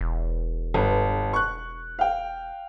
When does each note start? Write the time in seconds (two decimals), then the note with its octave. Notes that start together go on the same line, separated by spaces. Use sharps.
0.01 E1
0.74 G1 B4
1.33 C#6 F#6
1.99 F5 G5